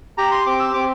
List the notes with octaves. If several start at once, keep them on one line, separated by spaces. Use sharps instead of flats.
G4 A#5
C6
C4 D6
E6
C4 D6